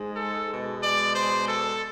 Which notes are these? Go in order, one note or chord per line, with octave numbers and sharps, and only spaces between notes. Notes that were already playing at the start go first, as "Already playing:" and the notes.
Already playing: G#2 G#3
A4
B2 G#3
D5
C5
A4